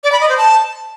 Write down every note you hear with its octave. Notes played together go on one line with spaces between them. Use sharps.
D5
B5
D#5
C5
A5